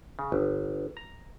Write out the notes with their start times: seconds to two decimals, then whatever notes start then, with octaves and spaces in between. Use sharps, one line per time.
0.19 C#3
0.32 G1
0.97 A#5